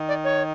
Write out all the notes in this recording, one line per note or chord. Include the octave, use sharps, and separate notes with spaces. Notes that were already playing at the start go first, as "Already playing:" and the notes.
Already playing: D#3
D5
C#5